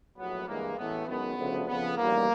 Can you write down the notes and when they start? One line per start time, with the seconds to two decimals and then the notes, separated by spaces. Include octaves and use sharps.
0.17 A#1 A2 F#3 B3
0.47 G2 E3 G#3 A#3
0.77 A1 A2 E3 A3 B3
1.07 F#2 D#3 G#3 B3
1.37 D2 C#3 F3 A3
1.67 F2 C#3 F3 B3
1.96 A1 G#2 D#3 G3 A#3